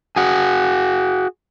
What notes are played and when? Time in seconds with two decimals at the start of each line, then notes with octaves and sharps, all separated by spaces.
0.16 F#4 G#4